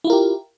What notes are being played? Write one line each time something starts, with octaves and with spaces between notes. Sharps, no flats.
E4 F4 G4 A#4